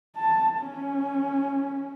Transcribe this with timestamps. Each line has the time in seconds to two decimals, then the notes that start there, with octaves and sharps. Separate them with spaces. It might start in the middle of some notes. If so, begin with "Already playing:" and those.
0.16 A5
0.61 C#4